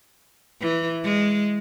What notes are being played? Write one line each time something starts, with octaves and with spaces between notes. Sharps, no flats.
E3
G#3